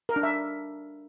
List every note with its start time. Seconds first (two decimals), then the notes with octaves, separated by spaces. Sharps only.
0.09 A#4
0.16 D4
0.23 E5